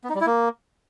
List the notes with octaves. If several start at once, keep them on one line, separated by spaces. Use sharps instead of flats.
B3
D#4
G3
E4
A#3